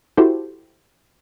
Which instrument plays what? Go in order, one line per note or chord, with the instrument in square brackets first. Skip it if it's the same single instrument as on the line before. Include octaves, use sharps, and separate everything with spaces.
[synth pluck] E4 F#4 G4 A4 C5